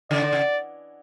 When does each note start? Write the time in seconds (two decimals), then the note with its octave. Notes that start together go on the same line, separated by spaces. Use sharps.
0.11 C#3 D5
0.22 D3
0.33 C#3